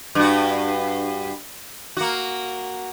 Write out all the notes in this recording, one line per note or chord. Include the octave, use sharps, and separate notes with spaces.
G2 F#4
A#3 F#4